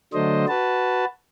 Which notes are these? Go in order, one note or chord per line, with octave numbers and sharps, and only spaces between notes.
D3 F#3 A3 D4 C5 D#5
F#4 B4 A5